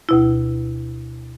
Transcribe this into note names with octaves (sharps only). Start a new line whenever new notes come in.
D2 B2 E4